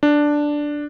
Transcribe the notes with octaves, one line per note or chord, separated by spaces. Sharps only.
D4